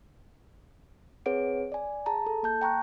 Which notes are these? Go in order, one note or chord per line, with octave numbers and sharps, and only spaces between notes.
C4 G#4 B4 C#5 F#5 D7
D5 G#5
G#4 A5 A#5
A4
A#3 A5 G6
G5 A#5 C#6 F#6